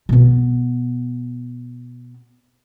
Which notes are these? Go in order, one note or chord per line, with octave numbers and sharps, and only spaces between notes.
B2 B3